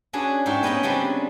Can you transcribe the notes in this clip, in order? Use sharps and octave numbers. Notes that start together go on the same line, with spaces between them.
C#4 D4 F#4 G#4 B4
G#2 G4 C#5 E5 G5
B3 C#4 B4 D#5 F#5 G5
C#3 F#3 G3 B3 C4 D4